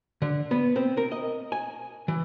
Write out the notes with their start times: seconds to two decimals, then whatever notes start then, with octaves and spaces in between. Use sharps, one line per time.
0.22 D3
0.51 B3
0.76 C4
0.97 A#4
1.12 D#5
1.52 G#5
2.08 E3